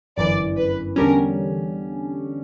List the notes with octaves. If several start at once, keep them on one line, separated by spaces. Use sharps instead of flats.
G1 F#2 E3 D5
B4
E2 D3 G3 C#4 A#4